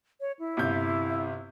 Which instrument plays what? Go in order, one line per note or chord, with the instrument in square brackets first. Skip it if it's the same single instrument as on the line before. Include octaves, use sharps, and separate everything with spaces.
[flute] C#5
E4
[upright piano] G1 C3 G6